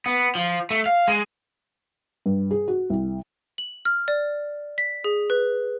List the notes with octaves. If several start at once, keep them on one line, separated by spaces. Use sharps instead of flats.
B3
F3
A3
F5
G#3
G2
G#4
F#4
C2
F#7
F6
D5
B6
G#4
B4